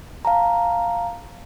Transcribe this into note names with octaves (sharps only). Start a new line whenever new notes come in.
F5 A5 A#5